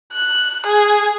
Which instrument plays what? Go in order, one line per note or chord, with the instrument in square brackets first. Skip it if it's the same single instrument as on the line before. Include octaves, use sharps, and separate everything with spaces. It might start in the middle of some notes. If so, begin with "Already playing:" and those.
[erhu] F#6
G#4